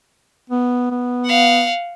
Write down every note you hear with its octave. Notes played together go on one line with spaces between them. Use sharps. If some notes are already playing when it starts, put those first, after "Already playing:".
B3
B3
F5 F#5